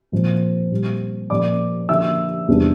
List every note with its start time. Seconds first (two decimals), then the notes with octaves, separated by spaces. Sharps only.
0.12 A#2 F3 C4
0.71 A#2 G3 C4
1.30 A#2 F3 A#3 D5 D6
1.89 D3 F3 A#3 D4 E5 E6
2.48 E2 C3 G3 D4